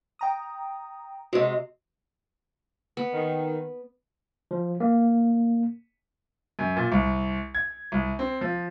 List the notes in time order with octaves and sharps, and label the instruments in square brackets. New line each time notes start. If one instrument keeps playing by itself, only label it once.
[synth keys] G5 A#5 D#6
[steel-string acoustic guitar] C3 G#3 [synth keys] F#4 D#5
[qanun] B3
[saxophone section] D#3
[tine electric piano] F3
A#3
[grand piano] F#2
A#2
C2
G#6
C2
C4
F3